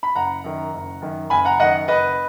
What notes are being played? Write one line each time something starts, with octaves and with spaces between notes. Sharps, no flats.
B5
F#1 F#5 A#5
F#2 D#3
F#1
F#2 D#3
F#1 G#5 B5
F#5 A#5
F#2 D#3 D#5 F#5
F#1 B4 D#5